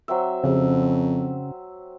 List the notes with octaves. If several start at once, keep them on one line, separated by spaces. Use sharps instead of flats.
F#3 C4 E5
F2 C#3